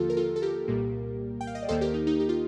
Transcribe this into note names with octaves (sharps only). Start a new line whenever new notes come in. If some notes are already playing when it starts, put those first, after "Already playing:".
Already playing: D#2 D3 F3 A#3 F4 G4 A4
A#4
F4 A4
A4
G4 A#4
C2 A#2 G3 A#3
G5
F5
D#5
D5
D#2 D#3 A#3 A4 C5
G4 A#4
D#4
D#4
G4
F4